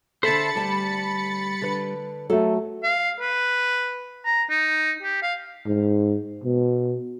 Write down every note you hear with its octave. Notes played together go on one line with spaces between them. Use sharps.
D3 A4 C5 E5 A5 B5 A6 C#7
D2 G3 A5
D3 B4
F#3 A3 A4
F5
B4
A#5
D#4
G4
F5
G#2
B2